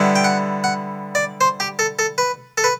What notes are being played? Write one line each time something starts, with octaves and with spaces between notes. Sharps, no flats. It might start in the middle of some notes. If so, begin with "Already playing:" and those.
Already playing: D3 G3 B3 E4
G5
F#5
F#5
D5
C5
G4
A4
A4
B4
A4
B4